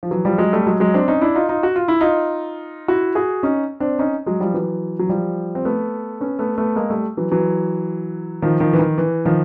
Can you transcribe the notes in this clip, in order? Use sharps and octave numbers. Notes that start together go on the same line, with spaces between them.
F3
E3 F#3
F3 G3
F#3 G#3
G3 A3
F#3 G#3
F#3 G#3
C4 D4
C#4 D#4
D4 E4
D#4 F4
D#4 F4
F#4
F4
E4
D#4 F4
E4 F#4
F#4 G#4
C#4 D#4
C4 D4
C#4 D#4
F#3 G#3
F3 G3
E3 F#3
F#3
F3 G3
C4
A3 B3
B3 C#4
A3 B3
A3 B3
G#3 A#3
G3 A3
E3 F#3
E3 F#3
D#3 F3
D#3 F3
E3
D#3
E3
D#3 F3